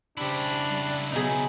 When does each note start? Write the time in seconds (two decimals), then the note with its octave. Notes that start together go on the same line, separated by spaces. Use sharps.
0.17 C#3 D4 E4 G4 C5
0.69 G3
1.12 B2 F#3 D#4 G#4